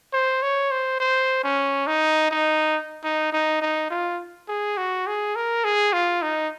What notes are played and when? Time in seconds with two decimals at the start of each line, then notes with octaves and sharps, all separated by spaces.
0.13 C5
0.42 C#5
0.71 C5
1.00 C5
1.43 C#4
1.87 D#4
2.31 D#4
3.04 D#4
3.32 D#4
3.62 D#4
3.91 F4
4.48 G#4
4.77 F#4
5.07 G#4
5.35 A#4
5.64 G#4
5.93 F4
6.22 D#4